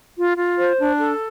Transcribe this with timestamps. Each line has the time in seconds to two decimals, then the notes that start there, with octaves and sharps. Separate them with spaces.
0.16 F4
0.36 F4
0.58 C5
0.78 D4
0.99 A4